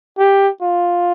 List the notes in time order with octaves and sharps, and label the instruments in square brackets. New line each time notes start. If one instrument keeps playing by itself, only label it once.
[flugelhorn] G4
F4